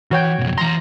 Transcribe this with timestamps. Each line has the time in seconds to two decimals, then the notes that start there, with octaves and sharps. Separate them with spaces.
0.11 E3 F#4 C#5 G5
0.39 B1 F2
0.58 E3 A#5 C6